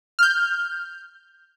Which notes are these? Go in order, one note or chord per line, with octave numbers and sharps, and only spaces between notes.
F6 G6